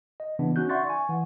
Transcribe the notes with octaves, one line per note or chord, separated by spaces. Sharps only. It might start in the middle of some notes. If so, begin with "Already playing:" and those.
D#5
C#3 E3 B3 D4
C#4 D#4 F#4 F#6 G6
D5 E5 F#5 C6 C#6 A6
G#5 C#6
E3 F#5